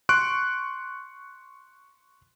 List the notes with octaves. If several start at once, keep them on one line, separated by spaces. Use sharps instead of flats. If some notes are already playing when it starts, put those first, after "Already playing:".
C6 C#6 F#6 D7